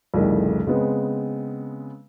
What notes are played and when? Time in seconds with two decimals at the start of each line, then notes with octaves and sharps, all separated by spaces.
0.14 C2 F2 A2 C#3 D#4 A#4
0.66 C#3 G#3 B3 C4